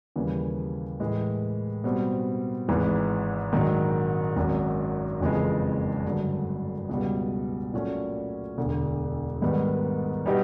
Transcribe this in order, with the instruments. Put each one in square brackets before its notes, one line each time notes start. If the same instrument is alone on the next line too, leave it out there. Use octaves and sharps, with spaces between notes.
[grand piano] D#2 C#3 E3 G3
A2 E3 G#3
B2 G3 C4
G#1 G#2 E3 G#3
A#1 G#2 D#3 F#3
G#1 F#2 D#3 F#3
F#1 F2 C#3 E3 G#3
G2 D3 F#3 A3
C#2 B2 G3
A#2 F#3 A3 C#4
E1 D2 D3
G#2 D#3 G3 B3
B2 G3 B3 D#4 G4